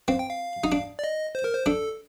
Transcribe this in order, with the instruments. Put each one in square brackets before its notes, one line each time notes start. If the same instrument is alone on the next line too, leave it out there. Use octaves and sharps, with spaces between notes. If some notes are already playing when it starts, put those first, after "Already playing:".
[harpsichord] C4 [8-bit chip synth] F5
[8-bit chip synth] G5
F5
[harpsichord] D#4
D4
[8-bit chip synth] D5
D#5
C5
A#4
C5
[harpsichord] D4 [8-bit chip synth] A4